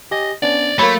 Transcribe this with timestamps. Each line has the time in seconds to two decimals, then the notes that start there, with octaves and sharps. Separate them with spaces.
0.11 G4 D#5 G#5
0.42 B3 C#4 D4 D5
0.79 F#3 A3 A#3 C#5 B5